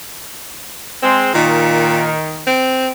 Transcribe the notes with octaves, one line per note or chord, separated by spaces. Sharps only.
G#3 C4
A#2 D#3
C4